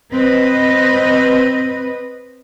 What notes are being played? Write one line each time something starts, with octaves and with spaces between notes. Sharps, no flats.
C4 B4 D#5